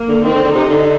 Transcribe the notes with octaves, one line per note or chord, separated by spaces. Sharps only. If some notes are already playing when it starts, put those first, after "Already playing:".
Already playing: A#3
D3
D#3 C4
D3
D3
C3 D#4
D3